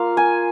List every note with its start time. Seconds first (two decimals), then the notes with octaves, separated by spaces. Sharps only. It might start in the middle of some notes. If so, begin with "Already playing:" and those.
Already playing: A#3 F4 F5
0.17 G#5